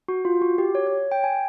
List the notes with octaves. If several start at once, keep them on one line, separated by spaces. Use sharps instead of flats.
F#4
F4
F#4
G4
C#5
C#5
G5
G#5